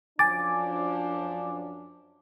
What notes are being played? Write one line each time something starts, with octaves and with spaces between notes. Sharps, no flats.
F#2 F3 D4 G#5 D6 A6